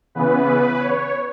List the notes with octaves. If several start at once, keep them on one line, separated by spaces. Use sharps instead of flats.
C#3 E3 B3 B4
C#5